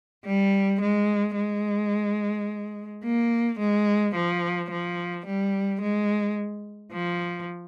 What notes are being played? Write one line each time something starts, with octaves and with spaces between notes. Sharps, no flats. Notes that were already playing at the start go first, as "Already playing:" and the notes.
G3
G#3
G#3
A#3
G#3
F3
F3
G3
G#3
F3